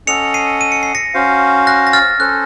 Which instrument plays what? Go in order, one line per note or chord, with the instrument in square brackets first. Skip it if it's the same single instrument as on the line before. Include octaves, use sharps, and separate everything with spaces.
[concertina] C#4 A4 D#5 F#5 [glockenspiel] C#7 F7
[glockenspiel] C7 D#7
D#7
C#7
C7
A#6 C#7
[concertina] C#4 F#4 C5 F5
[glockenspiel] F#6 A#6
A#6
F6 A6
[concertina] C#4 A4 C5 [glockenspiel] F#6